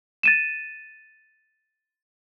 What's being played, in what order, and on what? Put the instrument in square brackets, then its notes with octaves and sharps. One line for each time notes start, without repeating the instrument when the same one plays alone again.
[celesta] A6 D#7 E7